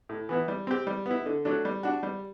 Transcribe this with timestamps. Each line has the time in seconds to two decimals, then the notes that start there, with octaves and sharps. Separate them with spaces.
0.09 A2
0.29 E3 B3 E4
0.48 G3
0.67 C4 G4
0.87 G3
1.06 B3 E4
1.26 D3
1.45 F#3 A3 D4
1.65 G3
1.83 D4 F#4
2.03 G3